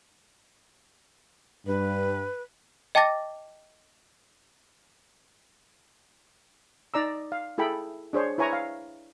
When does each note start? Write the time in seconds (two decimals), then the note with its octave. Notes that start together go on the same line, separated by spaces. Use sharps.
1.66 G2 B4
2.95 D#5 G5 A5 D6 A6 A#6
6.94 D#4 D5 A#5 E6
7.32 F5
7.58 E4 G#4 A4 G5 B5
8.13 D4 G#4 C5 C#5
8.38 E4 B4 C#5 G#5 A#5 C#6
8.53 F5